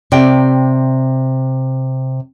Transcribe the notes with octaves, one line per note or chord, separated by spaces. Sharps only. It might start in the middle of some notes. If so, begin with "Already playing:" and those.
C3 D5 G5